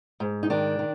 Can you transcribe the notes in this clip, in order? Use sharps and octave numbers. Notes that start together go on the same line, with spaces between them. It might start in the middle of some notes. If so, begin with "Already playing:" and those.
G#2
D#4
D#3 D4
D#3